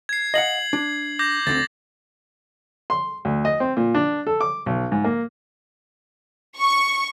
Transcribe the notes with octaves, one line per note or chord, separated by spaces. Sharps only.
G#6 C7
D#5 F5 F#5 C7 F#7
D4
D6 G6 A#6
D2 D3 C4 A6
C6
D2
D#5
C4
A#2
D4
A4
D6
B1
G#2
A#3
C#6